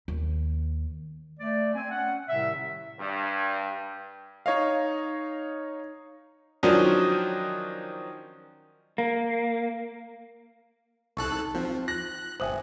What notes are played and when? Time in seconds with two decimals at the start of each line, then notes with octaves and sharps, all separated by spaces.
0.08 D#2
1.40 A3 D5
1.75 C4 G#5
1.91 C#4 F#5
2.29 A2 C3 D#3 G3 E5
3.00 G2
4.46 D#4 C#5 D#5 F5
6.63 D#3 F3 F#3 C#4 D4 D#5
8.98 A#3
11.17 C2 D#4 A4 A5 C#6 F#6
11.55 F3 C4
11.88 F4 F#6 A#6
12.40 G1 C5 E5 G5 G#5 D#6 F#7